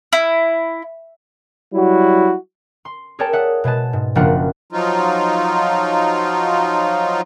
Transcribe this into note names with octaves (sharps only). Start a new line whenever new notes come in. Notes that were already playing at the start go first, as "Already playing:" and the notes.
E4
F#3 G3 E4 F#4
C6
G#4 A#4 C#5 D5 G5 A5
E5 F#5 D#6
B2 G#3 B4 A5
G#2
F#1 F3 A#3 D4 F4 F#5
F3 F#3 D#4 F4